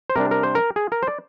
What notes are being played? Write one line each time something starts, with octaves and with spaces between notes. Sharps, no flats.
C5
C3 G3 D4 A#4
A#4
C5
A#4
G#4
A#4
C5
D5